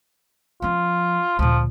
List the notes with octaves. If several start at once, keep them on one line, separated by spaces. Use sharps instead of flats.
F3 C#4 F4
D2 A#2 F3